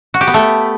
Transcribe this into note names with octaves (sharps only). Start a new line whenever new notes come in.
F#4
G4
B3
A3